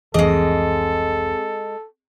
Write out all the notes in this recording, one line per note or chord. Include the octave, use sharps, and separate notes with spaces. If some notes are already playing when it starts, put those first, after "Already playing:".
F1 C2 E3 G#3 C4 G#4 A4 D#5